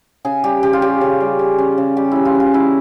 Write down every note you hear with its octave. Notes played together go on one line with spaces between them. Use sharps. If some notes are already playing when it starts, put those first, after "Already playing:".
C#3 G#4
G3 G4
C#3 G4
F4
C#4 G4
C#3
G3
C#3
C#4
C#3
G3 G4
C#3 E4
F4
C#4
F4
C#4 E4